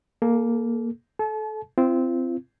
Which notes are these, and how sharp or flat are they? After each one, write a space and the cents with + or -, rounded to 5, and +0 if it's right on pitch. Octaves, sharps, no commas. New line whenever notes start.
A#3 +0 A4 -35
A4 -25 A5 -40
C4 -10 F4 -40